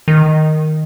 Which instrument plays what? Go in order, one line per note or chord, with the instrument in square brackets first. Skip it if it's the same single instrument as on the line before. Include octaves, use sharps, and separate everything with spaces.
[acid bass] D#3